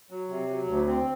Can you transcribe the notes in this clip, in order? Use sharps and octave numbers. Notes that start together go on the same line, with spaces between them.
F#3
C3
F#3
D2
C4